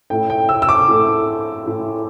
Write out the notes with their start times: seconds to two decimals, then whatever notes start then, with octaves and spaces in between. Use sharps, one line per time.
0.10 A2 A3 E4 G5
0.30 G5
0.49 E6
0.62 E6
0.69 D6
0.88 A2 A3 E4
1.65 A2 A3 E4